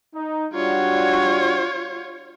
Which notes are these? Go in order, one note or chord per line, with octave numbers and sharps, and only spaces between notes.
D#4
G3 D4 F4 F#4 C#5